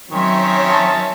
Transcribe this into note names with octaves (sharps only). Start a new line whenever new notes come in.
D#3 F#3 C4 C#4 C#5 E5
A5